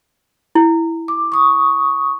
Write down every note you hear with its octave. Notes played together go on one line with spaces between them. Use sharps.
E4
D6
C#6 D#6